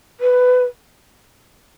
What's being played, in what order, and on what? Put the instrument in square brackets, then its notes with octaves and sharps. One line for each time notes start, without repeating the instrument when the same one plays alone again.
[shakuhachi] B4